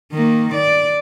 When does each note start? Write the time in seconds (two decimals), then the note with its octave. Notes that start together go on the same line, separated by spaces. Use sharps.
0.13 D#3 A#3
0.54 D5